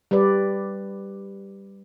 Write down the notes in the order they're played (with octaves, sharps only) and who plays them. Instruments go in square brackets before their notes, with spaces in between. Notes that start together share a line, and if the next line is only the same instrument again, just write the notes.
[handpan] G3 G4 B4 D5